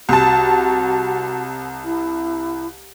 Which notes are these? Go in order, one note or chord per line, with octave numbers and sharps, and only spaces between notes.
C2 F#4 A5
E4